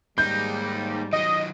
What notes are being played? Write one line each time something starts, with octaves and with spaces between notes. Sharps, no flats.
G#2 G3 A#3 D#4 G6
D#3 F#3 D#5